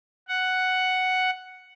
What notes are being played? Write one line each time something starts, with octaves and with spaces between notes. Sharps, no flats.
F#5